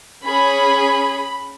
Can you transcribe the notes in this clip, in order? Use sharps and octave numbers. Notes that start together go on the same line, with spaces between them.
C#4 G#4 B5